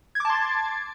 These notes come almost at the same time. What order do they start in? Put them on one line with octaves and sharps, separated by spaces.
G#6 D6 A5 C6 A6